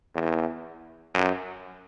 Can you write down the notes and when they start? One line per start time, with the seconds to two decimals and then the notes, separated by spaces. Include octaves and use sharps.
0.15 E2
1.14 F#2